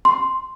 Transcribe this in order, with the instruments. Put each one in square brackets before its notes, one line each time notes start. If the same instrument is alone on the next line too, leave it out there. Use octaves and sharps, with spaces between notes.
[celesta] C6